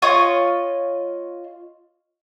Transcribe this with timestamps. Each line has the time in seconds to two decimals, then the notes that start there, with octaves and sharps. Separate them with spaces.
0.02 F4 C#5 D#5